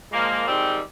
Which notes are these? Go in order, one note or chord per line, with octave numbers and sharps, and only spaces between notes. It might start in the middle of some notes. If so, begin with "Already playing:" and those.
A#2 F3 G#3 A#3
G#2 D#3 G3 C4